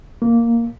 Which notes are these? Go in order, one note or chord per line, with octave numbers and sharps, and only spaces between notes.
A#3